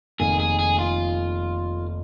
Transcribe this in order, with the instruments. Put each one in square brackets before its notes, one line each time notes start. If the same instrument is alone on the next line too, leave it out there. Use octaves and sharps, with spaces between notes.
[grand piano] F1 F2 D#3 A#3 [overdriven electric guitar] G#4
[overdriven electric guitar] G#4
G#4
F4